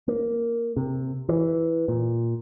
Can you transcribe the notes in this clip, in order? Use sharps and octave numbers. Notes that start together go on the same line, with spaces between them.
A#3
C3
E3
A#2